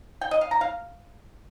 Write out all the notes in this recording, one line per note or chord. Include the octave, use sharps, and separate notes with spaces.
G5
D#5
F5
A#5
F5